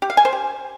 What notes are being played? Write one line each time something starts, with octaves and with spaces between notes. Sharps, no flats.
G4
F5
G#5
C5
G4